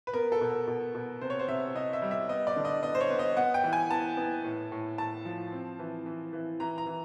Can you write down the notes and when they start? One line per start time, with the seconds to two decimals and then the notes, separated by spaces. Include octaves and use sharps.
0.07 B4
0.13 B3 A#4
0.32 A4
0.41 B2
0.50 A#4
0.67 B2
0.95 B2
1.21 C3 C5
1.30 C#5
1.39 C5
1.48 C3 E5
1.75 C3 D#5
1.93 E5
2.02 G3
2.11 E5
2.29 B3 D#5
2.47 D5
2.56 D3
2.65 D#5
2.83 B3 D#5
2.95 C5
3.01 C#5
3.10 B3
3.19 D#5
3.37 B3 F#5
3.54 G5
3.64 E3
3.73 G#5
3.90 B3 A5
4.17 B3
4.44 A2
4.72 A2
4.98 A2 A5
5.25 F3
5.52 C4
5.79 E3
6.06 E3
6.33 E3
6.60 E3 A#5
6.78 A#5
6.86 E3